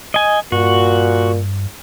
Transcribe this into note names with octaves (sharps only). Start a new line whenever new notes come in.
D#5 G#5
G2 A#2 F#4